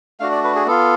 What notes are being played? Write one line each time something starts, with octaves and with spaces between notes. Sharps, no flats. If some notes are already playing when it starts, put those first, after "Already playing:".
A3 D4 F#4 F5
D5
B4
G#4
B3 F4 A4